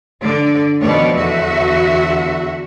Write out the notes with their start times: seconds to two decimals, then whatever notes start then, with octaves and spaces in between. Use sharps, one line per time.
0.24 D3 D5
0.81 B2 D#3 F3 C#5 D5
1.15 E2 D3 F#4 E5